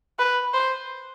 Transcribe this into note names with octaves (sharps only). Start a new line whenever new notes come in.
B4
C5